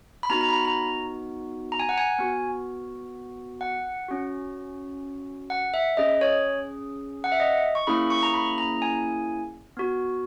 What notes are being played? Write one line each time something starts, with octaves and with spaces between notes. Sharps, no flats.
B5
B3 D#4 F#4 A#5
A#5
B5
A#5
A#5
A#5
G#5
F#5
G#5
B3 F#4
F#5
C#4 F#4
F#5
E5
C#4 G#4 D#5
C#5
F#5
E5
D#5
C#6
A#3 C#4 E4 G#4 B5
C#6
A#5
B5
A#5
G#5
B3 F#4